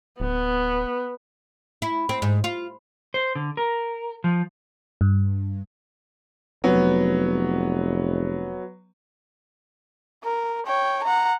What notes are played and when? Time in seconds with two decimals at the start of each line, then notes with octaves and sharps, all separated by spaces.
0.20 D1 B3
1.82 E4
2.09 C4
2.22 G#2
2.44 F4
3.14 C5
3.35 D3
3.57 A#4
4.24 F3
5.01 G2
6.64 F1 F#3 B3
10.23 A#4
10.66 C#5 G5
11.04 F#5 A#5